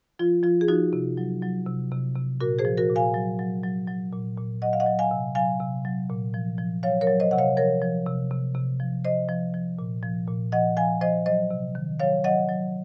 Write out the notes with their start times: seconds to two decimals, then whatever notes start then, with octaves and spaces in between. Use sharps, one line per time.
0.19 F3 F4
0.43 F3 F4
0.61 G#4
0.68 F3 D#4 F#4
0.93 C3
1.17 F#3
1.42 F#3
1.66 C3
1.91 C3
2.16 C3
2.41 A#2 F#4 A#4
2.59 G#4 C5
2.65 F3
2.78 F#4 A#4
2.90 A#2
2.96 F5 G#5
3.14 F#3
3.39 F#3
3.63 F#3
3.87 F#3
4.12 A#2
4.37 A#2
4.62 F#3 D#5 F#5
4.73 F5
4.80 D#5 F#5
4.86 F#3
4.99 F5 G#5
5.11 C3
5.35 F#3 F5 G#5
5.60 C3
5.85 F#3
6.10 A#2
6.34 F3
6.58 F3
6.83 F#3 C#5 F5
7.01 A#4 C#5
7.07 F#3
7.20 C5 D#5
7.31 C3 F#5
7.38 C#5 F5
7.57 F3 A#4 C#5
7.82 F3
8.06 C3
8.31 C3
8.55 C3
8.80 F3
9.04 F3 C5 D#5
9.29 F3
9.54 F3
9.79 A#2
10.03 F3
10.27 A#2
10.52 F3 D#5 F#5
10.77 F3 F5 G#5
11.01 F3 C5 D#5
11.26 F#3 C5 D#5
11.51 C3
11.75 D#3
12.00 F#3 C#5 F5
12.24 F#3 D#5 F#5
12.49 F#3